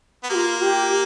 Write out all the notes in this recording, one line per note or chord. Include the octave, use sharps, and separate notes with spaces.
B3
A#3 F4 G4
G4